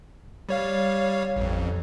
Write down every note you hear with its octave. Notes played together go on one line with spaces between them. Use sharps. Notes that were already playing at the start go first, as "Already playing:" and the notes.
G3 C#5 F5
A1 F2